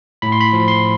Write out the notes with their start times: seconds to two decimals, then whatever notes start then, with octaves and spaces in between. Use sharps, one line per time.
0.22 A2 B5
0.32 C6
0.41 B5
0.53 F3
0.68 C6